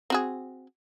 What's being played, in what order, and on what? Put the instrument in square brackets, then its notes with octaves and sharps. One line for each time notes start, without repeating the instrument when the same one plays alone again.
[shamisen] C4 F#4 G#4